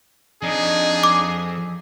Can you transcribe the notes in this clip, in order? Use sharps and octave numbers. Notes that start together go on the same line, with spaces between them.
F2 D4 D#4 G#4 D#5
D6